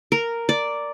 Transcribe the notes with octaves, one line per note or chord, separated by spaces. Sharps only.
A#4
D5